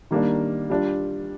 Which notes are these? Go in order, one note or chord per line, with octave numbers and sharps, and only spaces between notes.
D#3 G3 A#3 D4
G3 D4 F4